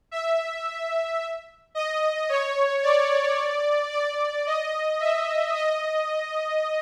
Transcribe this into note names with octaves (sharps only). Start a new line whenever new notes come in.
E5
D#5
C#5
D5
D5
D#5
E5
D#5